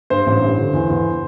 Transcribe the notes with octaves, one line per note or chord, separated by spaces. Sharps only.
G2 C5
A1
G2
D3
E2
E2